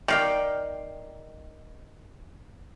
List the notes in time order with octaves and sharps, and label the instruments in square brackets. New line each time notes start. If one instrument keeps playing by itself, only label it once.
[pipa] D#3 [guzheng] D5 F5 G5